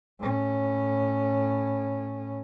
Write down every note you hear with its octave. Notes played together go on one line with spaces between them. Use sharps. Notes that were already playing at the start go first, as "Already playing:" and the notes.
A2 C#4